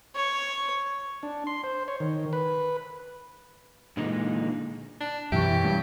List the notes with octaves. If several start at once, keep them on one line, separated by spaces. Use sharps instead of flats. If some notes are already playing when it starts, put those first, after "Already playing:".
C#5
D4
C6
C5
C#5
D#3
B4
A#2 D3 E3 G#3 D#4
D4
F#2 B2 E3 G4 E5 C#6
G2